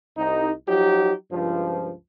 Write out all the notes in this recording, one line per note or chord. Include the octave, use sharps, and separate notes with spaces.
C2 D#4
F3 F#3 D#4 G4
C#2 G2 F3